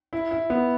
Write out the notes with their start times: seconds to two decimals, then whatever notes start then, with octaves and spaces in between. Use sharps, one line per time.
0.13 E4
0.31 E4
0.50 B3